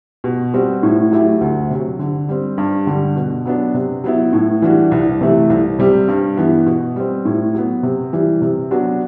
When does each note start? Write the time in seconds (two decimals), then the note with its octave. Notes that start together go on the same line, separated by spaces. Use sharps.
0.24 B2
0.54 G3 C4 F#4
0.83 A2
1.12 F#3 A3 E4 G4
1.41 D2
1.70 C3 F#3
1.99 D3
2.29 G3 C4
2.58 G2
2.87 D3 G3
3.16 B2
3.45 F#3 B3 D4
3.74 C3
4.04 F#3 B3 E4
4.33 A2
4.62 E3 G3 D4 F#4
4.91 C2
5.21 C3 E3 A3
5.50 C2
5.79 C3 G3 C4 G4
6.08 G2
6.37 E3 B3
6.66 B2
6.96 G3 C4
7.25 A2
7.55 F#3 B3
7.83 C3
8.13 E3 G3
8.42 C3
8.71 F#3 B3 D4 F#4